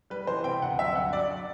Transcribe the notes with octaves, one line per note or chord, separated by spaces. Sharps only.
G3 B4
E3 C5
C3 G5
D2 F#5
F#3 E5
G2 F#5
F#3 D5